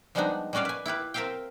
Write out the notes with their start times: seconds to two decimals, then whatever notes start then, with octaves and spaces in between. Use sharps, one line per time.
0.15 F3 G3 G#3 B3 D4 D#4
0.53 G3 G#3 C#4 F#4 D5 F5
0.65 B4 G#5
0.86 E4 F4 G4 B4
1.14 C4 A#4 C5 E5 F5 G5